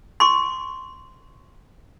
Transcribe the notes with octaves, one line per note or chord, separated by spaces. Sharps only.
C6 C#6